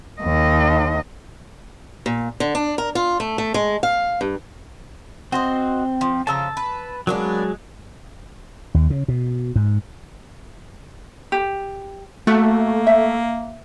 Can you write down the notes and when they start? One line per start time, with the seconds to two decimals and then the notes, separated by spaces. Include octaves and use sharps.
0.22 D#2 D#5
2.06 A#2
2.40 D3
2.55 D4
2.78 A#4
2.95 F4
3.20 A3
3.38 A3
3.54 G#3
3.83 F5
4.21 G2
5.32 C4 F#4 C5 D#5
6.01 F3
6.27 C#3 F3 A5 A#5 E6
6.57 B4
7.07 F#3 G#3 A#3 B3 D4
8.74 D#2
8.90 C#3
9.08 B2
9.56 G#2
11.32 G4
12.27 A3 A#3 F#4
12.87 E5